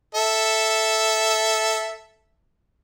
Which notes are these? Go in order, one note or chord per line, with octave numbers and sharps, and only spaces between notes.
A4 E5